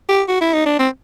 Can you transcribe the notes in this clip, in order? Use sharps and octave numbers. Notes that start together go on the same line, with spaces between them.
G4
F#4
E4
D#4
D4
C4